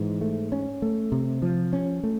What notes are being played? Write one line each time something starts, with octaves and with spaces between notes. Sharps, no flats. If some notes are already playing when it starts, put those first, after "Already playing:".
Already playing: G#2 E3
A3
C#4
A3
C3
F3
C#4
A3